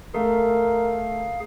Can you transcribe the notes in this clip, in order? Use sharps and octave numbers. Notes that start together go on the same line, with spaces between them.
A3 G#4 A#4 F5